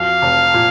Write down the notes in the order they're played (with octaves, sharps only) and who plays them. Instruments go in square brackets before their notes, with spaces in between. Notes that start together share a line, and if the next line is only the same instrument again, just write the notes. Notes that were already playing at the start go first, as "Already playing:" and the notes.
Already playing: [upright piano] F2 F#4 [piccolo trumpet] F5
[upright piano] F1
A#2